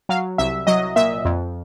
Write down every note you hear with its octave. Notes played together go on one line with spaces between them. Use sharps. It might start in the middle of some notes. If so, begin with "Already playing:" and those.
F#3 F5
C2 E5
F#3 D#5
A#2 E5
F2